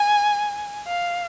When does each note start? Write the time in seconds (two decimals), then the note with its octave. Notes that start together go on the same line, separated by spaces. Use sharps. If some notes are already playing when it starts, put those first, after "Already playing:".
Already playing: G#5
0.88 F5